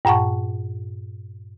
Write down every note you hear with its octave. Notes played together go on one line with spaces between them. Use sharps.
G2 A#2 F#5 A5 C#6